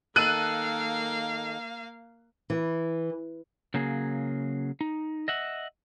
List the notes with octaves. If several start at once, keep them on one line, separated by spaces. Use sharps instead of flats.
D#3 A#3 A4 F5 F#6 D#7
E3
C#3 F#3 A#3 G#4
D#4
D#5 E5 F#5